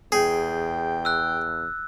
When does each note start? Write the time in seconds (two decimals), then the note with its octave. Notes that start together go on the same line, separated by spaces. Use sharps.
0.12 E2 G#4 G5
1.05 E6 F#6